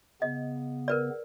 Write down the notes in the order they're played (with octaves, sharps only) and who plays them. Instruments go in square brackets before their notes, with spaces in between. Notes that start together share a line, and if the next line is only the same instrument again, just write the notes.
[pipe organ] C#3 B3 [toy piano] D#5
[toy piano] A#4 B4 D5